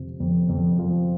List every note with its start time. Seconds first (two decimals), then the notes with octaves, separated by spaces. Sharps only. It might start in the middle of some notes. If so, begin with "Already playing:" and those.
Already playing: F2 C3 F3
0.20 F2
0.49 F2
0.79 F3